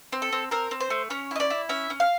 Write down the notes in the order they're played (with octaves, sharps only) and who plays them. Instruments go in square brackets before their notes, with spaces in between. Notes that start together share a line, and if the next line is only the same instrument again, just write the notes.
[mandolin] C4
A4
C4
C4 A#4
C4
C5
A3
C#4 C#5
E4 D#5
D5
E4
C#4 E5
C#4
F5